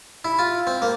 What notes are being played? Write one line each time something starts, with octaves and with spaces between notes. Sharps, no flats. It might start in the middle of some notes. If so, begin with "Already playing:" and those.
E4
F4
C4
A#3